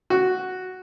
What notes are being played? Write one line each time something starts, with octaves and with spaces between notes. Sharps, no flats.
F#4